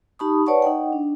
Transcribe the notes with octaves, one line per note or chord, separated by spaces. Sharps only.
D#4 G4 A5 B5 C#6 D#6
B4 C#5 D5 F#5 A5 C#6
D#4 D#5 F#5 G5
D4